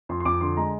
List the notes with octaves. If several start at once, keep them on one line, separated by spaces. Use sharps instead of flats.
F2 C6
C6
F2 D6
D3 C6
G#3 A#5